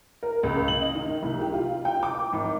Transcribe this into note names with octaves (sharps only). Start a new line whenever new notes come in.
A#4
C#2
F#7
D#5
D#3
C2
G4
F4
G5
D6
G#1